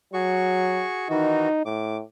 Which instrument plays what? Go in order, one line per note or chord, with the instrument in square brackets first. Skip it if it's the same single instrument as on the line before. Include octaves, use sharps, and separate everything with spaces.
[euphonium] F#3 [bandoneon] F#4 G#4 C#6
[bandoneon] D#3 E3 F#4 [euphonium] D#4
[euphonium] A2 [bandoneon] D6